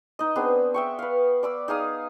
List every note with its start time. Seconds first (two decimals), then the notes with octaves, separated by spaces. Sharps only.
0.19 D#4 D#5
0.36 B3 C4 D4 G#4
0.74 E5 G5 C#6
0.99 B4 F5
1.43 D5 D6 E6
1.68 D#4 G#4 F5 D#6